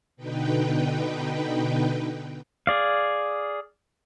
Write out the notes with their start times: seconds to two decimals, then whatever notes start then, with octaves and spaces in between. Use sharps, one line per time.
0.16 B2 D3 D#4 B4 G5
2.67 G#4 D5 F5